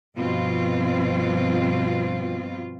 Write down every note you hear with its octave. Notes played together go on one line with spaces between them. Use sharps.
G2 B2 F3 C4 F4